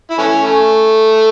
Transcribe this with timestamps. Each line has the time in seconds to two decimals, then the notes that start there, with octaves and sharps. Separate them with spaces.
0.10 E4
0.18 E3 A3 C#4
0.41 A3